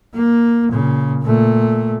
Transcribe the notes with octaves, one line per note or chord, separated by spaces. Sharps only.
A#3
A#2 C#3
A#2 A3